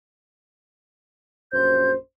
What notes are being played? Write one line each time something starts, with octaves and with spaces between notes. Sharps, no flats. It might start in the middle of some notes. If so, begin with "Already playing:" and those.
A#1 F#2 C5 G6